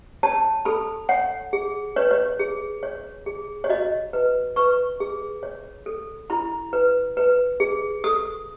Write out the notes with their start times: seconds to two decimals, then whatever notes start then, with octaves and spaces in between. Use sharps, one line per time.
0.23 C#5 A5
0.65 A4 B5
1.09 C#5 F#5
1.53 G#4
1.96 B4 C#5
2.11 C#5
2.39 G#4
2.83 C#5
3.26 G#4
3.64 C#5
3.69 F#4 D#5
4.13 B4
4.56 B4 C#6
5.00 G#4
5.43 C#5
5.86 A4
6.30 E4 B5
6.73 B4
7.17 B4
7.60 G#4
8.04 A4 D#6